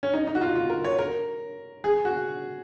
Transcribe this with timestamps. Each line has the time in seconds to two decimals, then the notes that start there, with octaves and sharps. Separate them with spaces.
0.03 C#4
0.14 D#4
0.27 D#4
0.35 F#4
0.41 F4
0.55 F4
0.70 A#4
0.84 C#5
0.99 A#4
1.84 G#4
2.05 F#4